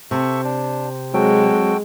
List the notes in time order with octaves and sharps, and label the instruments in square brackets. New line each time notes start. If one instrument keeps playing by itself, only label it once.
[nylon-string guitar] C3 [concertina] A4 E5 C#6
[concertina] D4
[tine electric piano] F#3 C4 [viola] G#3 [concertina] F#4 A4 G5